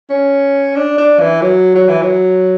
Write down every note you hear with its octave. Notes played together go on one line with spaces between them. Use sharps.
C#4
D4
D4
E3
F#3
F#3
E3
F#3